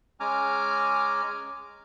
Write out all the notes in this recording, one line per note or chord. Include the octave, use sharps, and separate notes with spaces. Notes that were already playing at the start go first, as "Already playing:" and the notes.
G#3 C#4 G#5 A#5 D6 F6